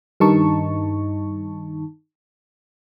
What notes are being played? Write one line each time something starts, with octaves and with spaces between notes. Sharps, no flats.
G2 D#3 D#4 A5 C#6